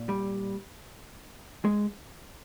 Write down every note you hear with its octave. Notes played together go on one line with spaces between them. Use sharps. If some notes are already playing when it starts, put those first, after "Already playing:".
Already playing: A#2
G3
G#3